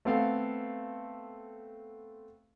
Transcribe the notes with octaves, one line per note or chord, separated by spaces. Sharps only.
A3 B3 C4 A4 F5